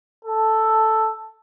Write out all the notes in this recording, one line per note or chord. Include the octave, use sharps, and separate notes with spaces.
A4